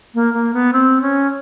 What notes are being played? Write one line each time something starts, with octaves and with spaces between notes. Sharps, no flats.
A#3
A#3
B3
C4
C#4